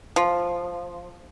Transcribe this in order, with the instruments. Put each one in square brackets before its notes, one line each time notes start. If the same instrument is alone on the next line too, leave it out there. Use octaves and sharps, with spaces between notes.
[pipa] F3